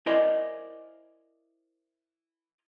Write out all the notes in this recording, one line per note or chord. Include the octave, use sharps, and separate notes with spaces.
E4 A#4 C5 D5 D#5 G#5